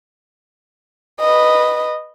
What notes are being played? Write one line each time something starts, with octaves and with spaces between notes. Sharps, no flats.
B4 D#5